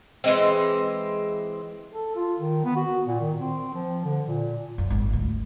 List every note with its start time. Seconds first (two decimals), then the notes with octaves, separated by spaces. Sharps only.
0.24 E3 G#3 C4
1.92 A4
2.15 F4
2.39 D#3
2.64 B3
2.76 F#4
3.07 A#2
3.20 D#3
3.38 C4
3.74 F3
4.04 D3
4.27 A#2
4.78 F#2
4.90 G#1
5.13 D2